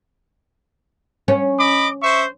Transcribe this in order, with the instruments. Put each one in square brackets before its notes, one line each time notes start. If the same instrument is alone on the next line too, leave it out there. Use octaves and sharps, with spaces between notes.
[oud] C#4
[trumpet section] D#5 B5 D6
C5 E5 C#6